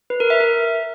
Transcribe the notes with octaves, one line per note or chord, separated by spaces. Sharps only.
B4
A#4
E5
A#4